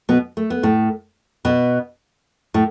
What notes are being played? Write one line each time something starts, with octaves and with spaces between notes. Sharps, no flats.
B2 B3
A3
B3
A2 A3
B2 B3
A2 A3